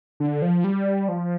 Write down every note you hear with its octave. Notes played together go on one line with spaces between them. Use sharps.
D3
F3
G3
F3